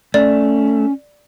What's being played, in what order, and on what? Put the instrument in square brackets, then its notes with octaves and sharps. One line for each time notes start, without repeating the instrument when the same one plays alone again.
[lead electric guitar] A3 [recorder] C#4 [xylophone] D5